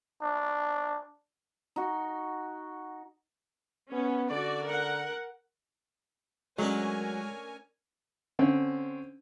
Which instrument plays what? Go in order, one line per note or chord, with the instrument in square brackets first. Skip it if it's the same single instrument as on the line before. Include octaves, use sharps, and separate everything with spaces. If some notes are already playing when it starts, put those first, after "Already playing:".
[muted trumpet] D4
[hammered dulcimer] D#4 F#4
[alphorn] B3 [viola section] C#4
[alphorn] D3 [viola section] F#4 D5
[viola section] A#4 F#5
[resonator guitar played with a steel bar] F#3 [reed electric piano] G#3 [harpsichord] A3 C#4 D4 [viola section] A#4 C#5 G#5
[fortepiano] D3 C4 C#4